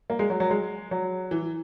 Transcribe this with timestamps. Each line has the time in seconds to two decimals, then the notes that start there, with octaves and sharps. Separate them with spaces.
0.10 A#3
0.19 G#3
0.30 F#3
0.40 F#3
0.50 G#3
0.91 F#3
1.31 E3